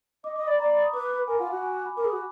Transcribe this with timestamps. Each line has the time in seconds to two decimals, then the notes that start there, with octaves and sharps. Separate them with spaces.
0.24 D#5 D6
0.36 D#5 D6
0.47 D5 B5
0.59 D5 A#5
0.70 B5
0.82 D#6
0.94 B4 D6
1.10 B5
1.28 A#4 G#5
1.39 F4 F#5
1.51 F#4 F#5
1.63 G#5
1.74 D6
1.86 B5
1.97 A#4 D6
2.05 G#4
2.12 F#4